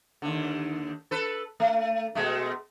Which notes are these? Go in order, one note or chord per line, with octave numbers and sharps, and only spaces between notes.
D#2 D3
A4 B4
A3
B2 G#3 A3